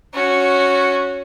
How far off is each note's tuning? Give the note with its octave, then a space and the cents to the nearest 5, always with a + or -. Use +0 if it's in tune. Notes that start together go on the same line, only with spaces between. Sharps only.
C#4 +0 F#4 -10